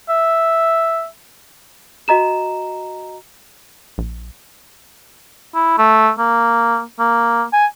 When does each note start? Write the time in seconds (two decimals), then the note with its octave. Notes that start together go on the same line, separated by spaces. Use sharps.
0.09 E5
2.08 F#4 D#5 A#5 E7
3.98 A#1
5.55 E4
5.78 A3
6.19 A#3
6.99 A#3
7.53 G#5